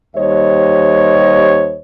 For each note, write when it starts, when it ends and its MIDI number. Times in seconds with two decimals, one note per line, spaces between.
0.16 1.79 39
0.16 1.79 55
0.16 1.79 72
0.16 1.79 73
0.16 1.79 75